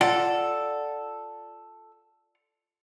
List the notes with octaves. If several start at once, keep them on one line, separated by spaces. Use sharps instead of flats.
F4 A4 D5 F#5